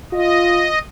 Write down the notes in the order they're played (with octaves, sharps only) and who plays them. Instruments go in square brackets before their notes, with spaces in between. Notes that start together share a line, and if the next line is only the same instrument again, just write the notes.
[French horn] F4 [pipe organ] D#5